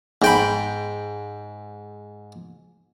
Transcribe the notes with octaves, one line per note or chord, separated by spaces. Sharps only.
G#2 G5 B5